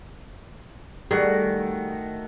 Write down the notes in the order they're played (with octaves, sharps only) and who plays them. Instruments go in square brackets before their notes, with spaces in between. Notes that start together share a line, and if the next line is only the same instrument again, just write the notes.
[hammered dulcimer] D#3 A3 F#4 [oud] G3 G#4